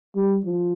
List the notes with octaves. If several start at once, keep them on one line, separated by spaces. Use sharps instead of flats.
G3
F3